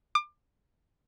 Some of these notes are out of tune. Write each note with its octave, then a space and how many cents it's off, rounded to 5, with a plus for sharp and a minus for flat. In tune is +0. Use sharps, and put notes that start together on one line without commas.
D6 +30